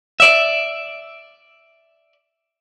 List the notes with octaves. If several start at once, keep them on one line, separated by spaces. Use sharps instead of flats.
D5 E5